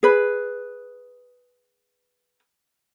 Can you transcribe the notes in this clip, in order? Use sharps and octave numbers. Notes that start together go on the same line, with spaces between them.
G#4 B4